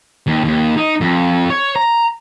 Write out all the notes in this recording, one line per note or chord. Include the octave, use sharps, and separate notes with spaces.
D#2
D#2
D#4
F2
C#5
A#5